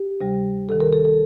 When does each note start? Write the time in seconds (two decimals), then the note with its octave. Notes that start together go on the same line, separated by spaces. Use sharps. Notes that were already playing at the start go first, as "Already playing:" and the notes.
Already playing: G4
0.21 D2 C3 G3
0.69 D2 C3 D#3 A4
0.80 A#4
0.93 A4
1.05 A4